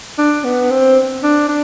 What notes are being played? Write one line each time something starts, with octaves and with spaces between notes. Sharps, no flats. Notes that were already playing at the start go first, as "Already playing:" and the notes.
D4
B3
C4
D4
D4